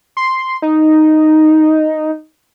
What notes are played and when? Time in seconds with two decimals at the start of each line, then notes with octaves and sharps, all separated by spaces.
0.17 C6
0.62 D#4